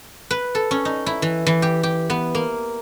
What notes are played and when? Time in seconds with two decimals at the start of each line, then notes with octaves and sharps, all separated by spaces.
0.31 B4
0.55 A4
0.71 C#4
0.85 D#4
1.06 E4
1.22 E3
1.46 E3
1.62 G4
1.83 G4
2.10 B3
2.35 A#3